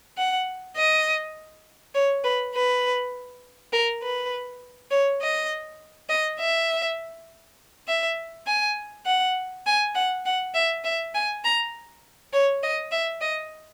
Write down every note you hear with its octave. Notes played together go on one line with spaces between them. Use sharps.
F#5
D#5
C#5
B4
B4
A#4
B4
C#5
D#5
D#5
E5
E5
G#5
F#5
G#5
F#5
F#5
E5
E5
G#5
A#5
C#5
D#5
E5
D#5